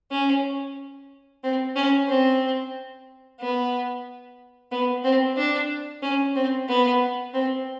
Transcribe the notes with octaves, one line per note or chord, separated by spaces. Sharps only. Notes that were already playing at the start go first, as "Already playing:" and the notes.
C#4
C4
C#4
C4
B3
B3
C4
D4
C#4
C4
B3
C4